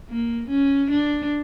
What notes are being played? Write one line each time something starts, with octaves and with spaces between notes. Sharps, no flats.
A#3
C#4
D4